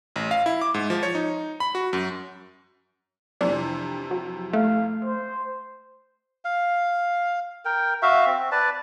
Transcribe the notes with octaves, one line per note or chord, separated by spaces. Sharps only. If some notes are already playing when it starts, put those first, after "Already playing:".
A1
F5
E4
D6
G#2
F3
C#5
D#4
B5
F#4
F#2
F2 C3 E3 D4
F#3
A3 F5
C5
F5
A#4 G5
F#4 E5 F5
C4
B4 D5 A5